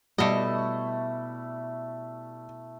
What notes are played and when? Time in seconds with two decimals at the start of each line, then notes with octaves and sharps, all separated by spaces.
0.18 B2 G3 A3 E4 D#5